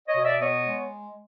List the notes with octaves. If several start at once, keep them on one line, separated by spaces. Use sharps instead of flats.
C#5 D#5
B2
D5 E5
B3 C#5 D#5
G#3